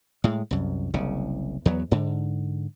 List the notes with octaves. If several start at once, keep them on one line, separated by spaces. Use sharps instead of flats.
A2 G#3
C2 F#2
F#1 C2 C#3
E2 F#3 B3
G#2 D3